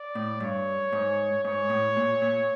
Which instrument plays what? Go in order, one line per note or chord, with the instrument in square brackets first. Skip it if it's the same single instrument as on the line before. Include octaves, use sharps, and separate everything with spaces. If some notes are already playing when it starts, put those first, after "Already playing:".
Already playing: [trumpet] D5
[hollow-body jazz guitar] A2
[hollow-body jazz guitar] G2 [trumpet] C#5
[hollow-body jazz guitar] G#2
[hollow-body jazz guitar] G#2 [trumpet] C#5
[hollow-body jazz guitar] A2
A#2
A#2